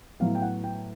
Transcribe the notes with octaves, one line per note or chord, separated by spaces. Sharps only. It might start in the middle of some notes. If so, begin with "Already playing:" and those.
A2 F#3 B3 F5
G5
F#5
G5